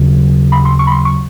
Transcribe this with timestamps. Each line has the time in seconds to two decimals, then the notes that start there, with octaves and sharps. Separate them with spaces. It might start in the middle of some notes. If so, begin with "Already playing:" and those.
Already playing: D#2 C#3 F#3
0.52 B5
0.65 C6
0.79 C#6
0.87 B5
0.92 C6
1.05 C#6